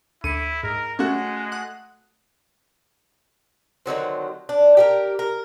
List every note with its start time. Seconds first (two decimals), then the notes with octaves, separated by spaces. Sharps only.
0.24 D2 E4 C#7 D#7
0.63 G#2 A#4
0.99 G#3 A3 C#4 F#4
1.52 F#5 D#6 F#6
3.86 D3 D#3 F#3 C4
4.49 D4
4.77 G4 A4 A#4
5.19 A#4